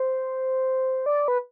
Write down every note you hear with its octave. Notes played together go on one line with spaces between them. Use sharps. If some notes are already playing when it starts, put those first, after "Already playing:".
Already playing: C5
D5
B4